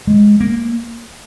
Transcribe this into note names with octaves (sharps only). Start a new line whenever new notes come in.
G#3
A#3